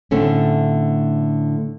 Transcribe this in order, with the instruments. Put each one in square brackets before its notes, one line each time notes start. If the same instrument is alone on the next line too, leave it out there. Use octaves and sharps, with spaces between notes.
[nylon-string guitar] A2 D3 A3 C4 C#4